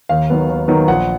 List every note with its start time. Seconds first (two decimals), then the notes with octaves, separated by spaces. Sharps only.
0.09 D#2 F5
0.30 D#3 F#3 B3
0.49 D#2
0.68 D#3 F#3 B3
0.88 A#1 F#5